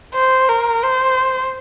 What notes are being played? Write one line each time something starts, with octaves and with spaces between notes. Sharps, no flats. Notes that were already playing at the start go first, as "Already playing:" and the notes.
C5
A#4
C5